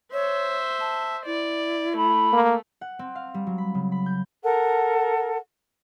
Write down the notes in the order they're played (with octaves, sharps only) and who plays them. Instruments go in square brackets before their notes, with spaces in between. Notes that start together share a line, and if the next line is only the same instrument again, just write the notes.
[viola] C5 E5 [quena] C#5
[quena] A5
[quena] E4 [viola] D5
[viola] A3 [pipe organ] B5
[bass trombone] A#3
[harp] F#5
C4
F5
G3
F#3
B5
C#3
B5
G6
[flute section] A4 A#4 F#5